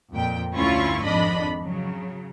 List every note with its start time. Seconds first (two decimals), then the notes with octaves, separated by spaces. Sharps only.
0.13 F2 A#2 G5
0.54 G1 D2 C#4 E4 F4 C#6
1.03 G#1 F2 G#2 D4 D#5 B5
1.62 C#3 F#3